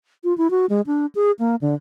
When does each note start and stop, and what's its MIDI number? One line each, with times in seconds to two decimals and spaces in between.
0.24 0.36 65
0.38 0.50 64
0.51 0.66 66
0.70 0.81 56
0.87 1.06 62
1.15 1.31 68
1.39 1.56 58
1.61 1.74 50